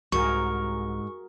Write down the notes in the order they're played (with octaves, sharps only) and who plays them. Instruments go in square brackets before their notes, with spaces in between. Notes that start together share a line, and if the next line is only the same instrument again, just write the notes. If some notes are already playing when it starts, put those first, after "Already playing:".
[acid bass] C2 [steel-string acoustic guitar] G#2 [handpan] F#4 G#4 A#4 [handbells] C#6